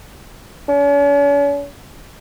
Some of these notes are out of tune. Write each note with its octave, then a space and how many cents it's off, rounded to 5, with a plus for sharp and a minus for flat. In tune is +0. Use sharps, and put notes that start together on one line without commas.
C#4 +45